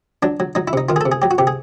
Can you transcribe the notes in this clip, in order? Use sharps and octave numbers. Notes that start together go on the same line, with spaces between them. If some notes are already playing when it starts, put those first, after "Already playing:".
F#3 D4
F#3
F#3 D#4
E4
C3 D#4
D#3 F4
G#4
C3 A4
G#4
F#3 G4
F#4
C3 G4
G#4